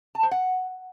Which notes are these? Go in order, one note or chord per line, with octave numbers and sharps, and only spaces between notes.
A5
C5
F#5